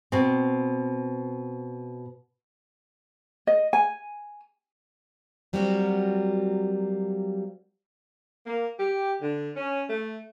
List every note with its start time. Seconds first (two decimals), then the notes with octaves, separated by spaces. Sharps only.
0.12 B2 C4
3.47 D#5
3.73 G#5
5.53 F#3 G3 A#3 C4 F4 F#4
8.47 A#3
8.80 G4
9.22 D3
9.57 C#4
9.90 A3